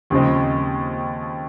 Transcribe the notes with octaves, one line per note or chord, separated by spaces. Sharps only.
D#2 C#3 F3 G#3 C4